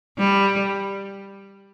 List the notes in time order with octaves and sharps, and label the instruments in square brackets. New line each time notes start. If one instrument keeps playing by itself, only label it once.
[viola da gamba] G3